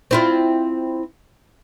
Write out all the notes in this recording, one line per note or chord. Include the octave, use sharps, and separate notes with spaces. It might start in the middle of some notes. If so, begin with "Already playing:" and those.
C4 E4 F4